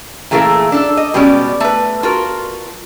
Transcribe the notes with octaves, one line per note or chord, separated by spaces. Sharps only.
A#2 E3 A3 G#4 A#4 F5
D4 A4
D#5
B2 G3 G#3 C#4 D5
A3 B4
F4 F#4 A#4